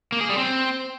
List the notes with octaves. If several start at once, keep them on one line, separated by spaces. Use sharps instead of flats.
A#3
G#4
G3
C4